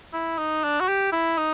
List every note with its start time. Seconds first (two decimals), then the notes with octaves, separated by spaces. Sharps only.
0.14 E4
0.38 D#4
0.64 D4
0.81 F#4
0.88 G4
1.13 E4
1.38 D#4